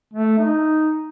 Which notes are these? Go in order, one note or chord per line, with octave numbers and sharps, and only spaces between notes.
A3
D#4